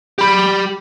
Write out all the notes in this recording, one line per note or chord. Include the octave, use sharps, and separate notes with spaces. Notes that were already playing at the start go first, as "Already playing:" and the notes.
G4 B5